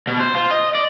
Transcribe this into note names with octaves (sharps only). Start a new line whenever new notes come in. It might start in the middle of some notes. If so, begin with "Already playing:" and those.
B2
C5
F4
D#5
D5